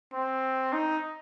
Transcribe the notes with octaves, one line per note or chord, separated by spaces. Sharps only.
C4
D#4